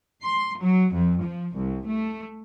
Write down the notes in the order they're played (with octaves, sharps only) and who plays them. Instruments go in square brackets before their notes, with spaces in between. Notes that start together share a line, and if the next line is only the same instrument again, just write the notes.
[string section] C6
F#3
F2
F3
C2
A3